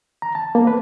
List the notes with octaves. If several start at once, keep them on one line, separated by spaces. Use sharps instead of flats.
A#5
A5
A#3
B4